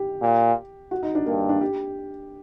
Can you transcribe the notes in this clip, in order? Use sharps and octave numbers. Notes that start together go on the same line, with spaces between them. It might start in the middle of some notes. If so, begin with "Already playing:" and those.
Already playing: G4
A#2
F#4
D#4
D4
G2 A#3
D4
G4